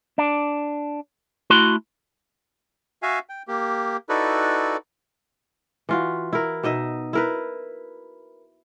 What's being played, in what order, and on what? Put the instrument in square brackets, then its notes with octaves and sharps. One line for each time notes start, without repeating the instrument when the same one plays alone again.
[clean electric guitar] D4
A3 E4 F#4 C6
[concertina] F#4 E5 F5 G#5
G5
A#3 G4
D#4 E4 F#4 A4 B4 D5
[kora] E3 F4 F#4
E4 A#4
B2 D#4 D#5 E5
E4 A#4 B4